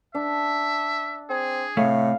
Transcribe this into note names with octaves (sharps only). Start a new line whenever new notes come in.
D4 E5
C4 G#4
A2 C3 A3 F5